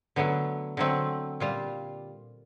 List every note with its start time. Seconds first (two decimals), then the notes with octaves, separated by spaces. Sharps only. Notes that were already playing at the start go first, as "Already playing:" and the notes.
0.16 D3 F#3 A3 B3
0.77 D3 F#3 A3 C4
1.40 A#2 G3 F4